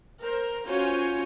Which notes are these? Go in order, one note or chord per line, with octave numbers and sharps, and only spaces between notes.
A#4 C5
C#4 F4 F#4 C5 C#5 G#5